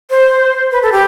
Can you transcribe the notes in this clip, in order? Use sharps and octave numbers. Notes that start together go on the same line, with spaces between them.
C5
B4
A4
G4